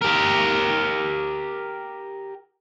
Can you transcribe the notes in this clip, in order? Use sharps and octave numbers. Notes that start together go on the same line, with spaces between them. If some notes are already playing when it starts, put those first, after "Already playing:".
G4 A#4